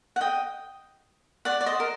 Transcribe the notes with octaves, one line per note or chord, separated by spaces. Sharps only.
F#5
D#5 G5
D5 F#5
D5
C5 D#5
A#4